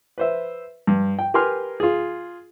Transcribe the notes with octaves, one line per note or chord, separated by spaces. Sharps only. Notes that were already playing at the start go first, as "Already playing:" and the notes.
B4 C5 E5
G2
G5
G4 A#4 B4 G#5 C6 F6
F4 G#4